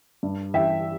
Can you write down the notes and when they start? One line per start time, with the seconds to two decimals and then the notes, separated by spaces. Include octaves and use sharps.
0.23 G2
0.54 E3 E5 G5